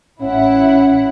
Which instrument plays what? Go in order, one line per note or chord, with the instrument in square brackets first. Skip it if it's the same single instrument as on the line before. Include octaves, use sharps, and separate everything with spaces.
[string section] A1 E4 F#5 [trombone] C#4